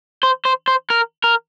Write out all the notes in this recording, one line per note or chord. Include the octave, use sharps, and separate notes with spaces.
C5
C5
C5
A#4
A#4